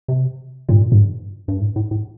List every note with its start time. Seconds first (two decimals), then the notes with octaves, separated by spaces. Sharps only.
0.08 C3
0.69 G2 A#2
0.92 G2
1.48 G2
1.61 A2
1.76 A2
1.91 A2